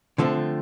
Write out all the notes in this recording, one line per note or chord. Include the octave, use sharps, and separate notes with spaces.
D3 F3 A3 C4